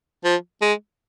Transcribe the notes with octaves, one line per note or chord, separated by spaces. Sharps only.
F3
G#3